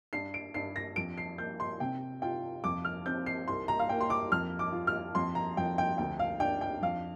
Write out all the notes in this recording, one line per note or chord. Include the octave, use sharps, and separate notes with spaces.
G2 C7
D7
G2 C7
A#6
F2 D7
C7
A#3 G6
C6
C3 G5
F4 G5
F2 D6
F6
C4 G6
C7
C2 C6
A#5
F5
A#3 G5
C6
D6
F2 F6
D6
F4
F6
F2 C6
A#5
F2 G5
G5
D2 G5
F5
D4 G5
G5
F2 F5